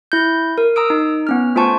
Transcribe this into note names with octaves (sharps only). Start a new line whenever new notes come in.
E4 G6
A#4
A#5 D#6 E6 D7
D#4
B3 C#4 F6
A3 F4 C5 G#5 A5 C#6